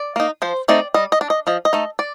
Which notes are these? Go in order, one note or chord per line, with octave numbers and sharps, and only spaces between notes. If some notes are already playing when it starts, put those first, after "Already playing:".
Already playing: D5
A#3 D#4
F3 C5
A3 C4 D#4 D5
G3 D#5
D#5
D4
D#5
F3 D#5
D#5
A3 D#4
D5